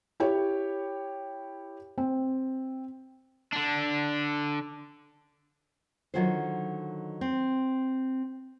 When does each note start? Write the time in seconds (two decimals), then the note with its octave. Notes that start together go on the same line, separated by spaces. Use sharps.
0.20 E4 G4 C#5
1.98 C4
3.52 D3 D4
6.14 D3 D#3 F#3 A3 F4 C5
7.21 C4